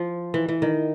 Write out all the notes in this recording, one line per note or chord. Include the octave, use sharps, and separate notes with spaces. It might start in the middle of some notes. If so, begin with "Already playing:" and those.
Already playing: F3
E3
E3
D#3